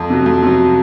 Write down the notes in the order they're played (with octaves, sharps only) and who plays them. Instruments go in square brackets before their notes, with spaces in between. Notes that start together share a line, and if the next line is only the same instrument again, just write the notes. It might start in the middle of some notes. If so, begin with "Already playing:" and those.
Already playing: [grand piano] F2
C3 F#3
F2
C3 F#3